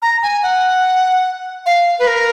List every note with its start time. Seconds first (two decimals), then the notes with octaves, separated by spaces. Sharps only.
0.02 A#5
0.23 G#5
0.43 F#5
1.66 F5
1.99 B4
2.07 A#4